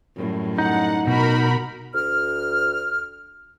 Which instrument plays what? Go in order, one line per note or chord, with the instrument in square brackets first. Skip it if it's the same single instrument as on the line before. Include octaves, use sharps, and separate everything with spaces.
[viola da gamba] F#2 A2 G3
[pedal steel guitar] D#4 [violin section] F#5
[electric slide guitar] B2 [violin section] F#4 A#4 B5
[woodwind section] D2 F6